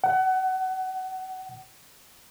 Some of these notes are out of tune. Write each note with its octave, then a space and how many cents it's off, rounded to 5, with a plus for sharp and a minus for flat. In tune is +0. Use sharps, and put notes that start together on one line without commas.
F#5 +25